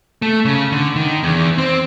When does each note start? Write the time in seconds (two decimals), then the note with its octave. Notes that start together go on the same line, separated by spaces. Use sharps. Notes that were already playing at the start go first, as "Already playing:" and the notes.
0.22 A3
0.45 C#3
0.72 D3
0.96 D#3
1.23 E2
1.58 C4